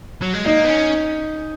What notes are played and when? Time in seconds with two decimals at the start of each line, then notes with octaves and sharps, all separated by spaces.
0.22 F#3
0.33 G#3
0.45 A#3 D#4
0.65 B3
0.68 C#4